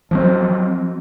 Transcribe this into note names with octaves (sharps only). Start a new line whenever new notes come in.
F3 F#3 C4